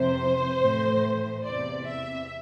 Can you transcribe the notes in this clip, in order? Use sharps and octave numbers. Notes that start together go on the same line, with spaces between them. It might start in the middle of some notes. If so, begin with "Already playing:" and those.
Already playing: F2 C3 E3 C5
A2 E3
E2 C3 E3 D5
E5